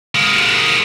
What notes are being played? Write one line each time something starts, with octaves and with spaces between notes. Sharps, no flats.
G#3 A#3